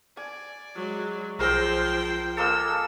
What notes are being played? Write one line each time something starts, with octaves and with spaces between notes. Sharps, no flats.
D5 G#5
F#3 G#3
B1 F3 G#4 A#4 C5 G5 E6 A#6
G#3 A#3 A4 E6